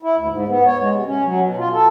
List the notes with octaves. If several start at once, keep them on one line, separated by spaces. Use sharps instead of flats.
E4
D2
G#2
B3
C#5
G#3
C3
C#4
F#3
B2
F4
A4